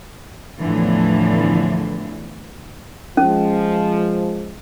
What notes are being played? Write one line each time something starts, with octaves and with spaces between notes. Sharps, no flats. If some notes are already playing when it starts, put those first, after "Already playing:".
E2 A2 D3 E3 F3
F3 G#3 C#4